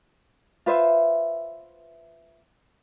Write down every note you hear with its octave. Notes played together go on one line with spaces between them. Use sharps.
F4 B4 C5 E5